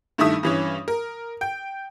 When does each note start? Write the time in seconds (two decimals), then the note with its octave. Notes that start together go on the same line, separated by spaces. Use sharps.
0.18 G2 D#3 A3 E4 E5 D#6
0.43 G2 E3 C#4
0.88 A#4
1.41 G5